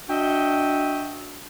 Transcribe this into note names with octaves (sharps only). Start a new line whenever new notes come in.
D4 F#4 D#5 E5 G5